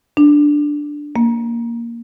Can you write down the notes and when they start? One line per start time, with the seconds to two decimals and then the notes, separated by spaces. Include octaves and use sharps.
0.17 D4
1.16 A#3